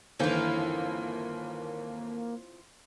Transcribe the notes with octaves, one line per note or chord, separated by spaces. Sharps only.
G1 D#2 E3 A#3 C4 E4 F4